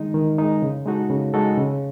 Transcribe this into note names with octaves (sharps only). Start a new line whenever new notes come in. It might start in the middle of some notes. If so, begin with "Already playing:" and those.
Already playing: D#3 G#3 D#4
D#3
G#3 D#4
C#3
G#3 D#4 F#4 A4
C#3
G#3 D#4 F#4 A4
C#3